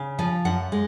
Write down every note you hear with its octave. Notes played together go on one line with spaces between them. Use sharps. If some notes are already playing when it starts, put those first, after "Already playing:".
Already playing: C#3
F3 G#5
F#2 F#5
G#3